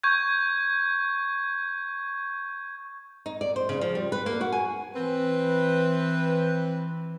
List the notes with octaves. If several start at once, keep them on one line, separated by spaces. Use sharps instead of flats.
C#6 G6 G#6
D#4
D5
C5
C#3
F3
G3
B4
A#3
F#4
G#5
E3 C4 B4